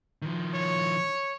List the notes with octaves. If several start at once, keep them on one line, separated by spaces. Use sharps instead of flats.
D#3 F3
C#5